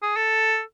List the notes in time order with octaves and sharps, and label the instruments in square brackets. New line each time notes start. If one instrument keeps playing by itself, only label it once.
[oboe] G#4
A4